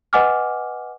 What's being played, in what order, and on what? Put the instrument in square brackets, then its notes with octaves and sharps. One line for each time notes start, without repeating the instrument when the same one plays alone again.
[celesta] B4 D#5 F#5 G#5 D6 F6